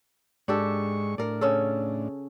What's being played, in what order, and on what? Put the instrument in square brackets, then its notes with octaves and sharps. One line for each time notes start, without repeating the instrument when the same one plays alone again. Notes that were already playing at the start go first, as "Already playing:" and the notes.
[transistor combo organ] G#2 G#3 C#6 [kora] D4 G4 A4
[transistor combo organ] A2 D4 [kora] A#4 D5
[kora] C#3 C#4 A4